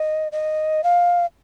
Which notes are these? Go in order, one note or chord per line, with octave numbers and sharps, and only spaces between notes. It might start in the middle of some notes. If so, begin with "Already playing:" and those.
Already playing: D#5
D#5
F5